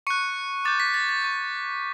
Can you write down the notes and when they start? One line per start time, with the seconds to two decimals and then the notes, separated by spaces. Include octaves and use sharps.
0.07 C#6 F#6 C#7
0.65 D6 G6 A6
0.80 B6
0.94 A6
1.09 A6
1.24 C#6 G6